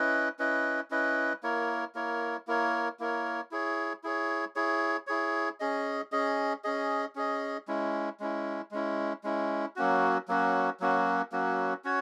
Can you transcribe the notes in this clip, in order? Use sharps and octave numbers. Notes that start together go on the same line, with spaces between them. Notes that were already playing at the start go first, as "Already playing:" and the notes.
Already playing: C#4 E4 B4 D#5
C#4 E4 B4 D#5
C#4 E4 B4 D#5
A#3 E4 A#4 C#5
A#3 E4 A#4 C#5
A#3 E4 A#4 C#5
A#3 E4 A#4 C#5
E4 G#4 C#5
E4 G#4 C#5
E4 G#4 C#5
E4 G#4 C#5
C#4 G#4 D#5
C#4 G#4 D#5
C#4 G#4 D#5
C#4 G#4 D#5
G#3 C#4 E4
G#3 C#4 E4
G#3 C#4 E4
G#3 C#4 E4
F#3 A#3 C#4 F#4
F#3 A#3 C#4 F#4
F#3 A#3 C#4 F#4
F#3 A#3 C#4 F#4
C#4 F#4 C#5